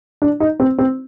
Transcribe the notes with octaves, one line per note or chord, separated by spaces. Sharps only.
D4
D#4
C4
C4